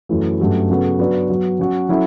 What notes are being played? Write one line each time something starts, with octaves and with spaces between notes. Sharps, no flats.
F#2 E3 A3
G2 F#3 A3 C#4 G4
C#3 F#3 B3 F#4 A4
F#3 B3 D4 F#4 B4
F#3 B3 F#4
F#3 C#4 F#4
F#3 C#4 E4 A4